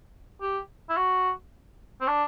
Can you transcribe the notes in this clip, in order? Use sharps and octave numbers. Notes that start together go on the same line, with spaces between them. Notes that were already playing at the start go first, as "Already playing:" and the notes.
G4
E4
F#4
C4
D4